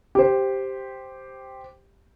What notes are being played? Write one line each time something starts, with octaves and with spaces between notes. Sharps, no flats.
G4 C5